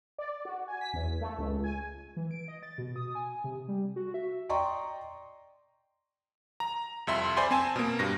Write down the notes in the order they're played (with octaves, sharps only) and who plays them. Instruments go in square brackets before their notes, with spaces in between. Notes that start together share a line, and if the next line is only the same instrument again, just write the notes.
[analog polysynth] D5
F#4
G#5
B6
E2
A3
C#2
G#5
[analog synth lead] E3
D7
D#5
A6
B2
D#6
G#5
C3
G3
F#4
E5
[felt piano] D5 D#5 G5 A#5 C6 C#6
[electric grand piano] A#5
C2 F2 E5 C6
C5 D5 G#5 B5 C6
C4 G#5 A5
B2 A#3
G2 A#6